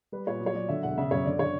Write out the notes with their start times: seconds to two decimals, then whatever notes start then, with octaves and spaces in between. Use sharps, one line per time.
0.12 G3 B4
0.27 A#2 C#5
0.41 F#3
0.46 C#5
0.55 F#3 D5
0.69 D3 E5
0.83 E1 F#5
0.98 C#3 E5
1.11 F#2 C#5
1.25 D3 D5
1.39 D3 C#5